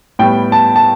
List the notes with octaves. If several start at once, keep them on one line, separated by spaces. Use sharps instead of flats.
A2 G3 B3 G5
A5
A5